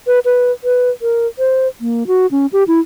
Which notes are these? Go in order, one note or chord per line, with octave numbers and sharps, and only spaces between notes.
B4
B4
B4
A#4
C5
A#3
F#4
C#4
G4
E4